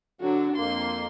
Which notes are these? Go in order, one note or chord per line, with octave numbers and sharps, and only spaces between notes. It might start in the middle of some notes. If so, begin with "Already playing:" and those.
D3 F#3 D4 F#4
F2 A#3 C6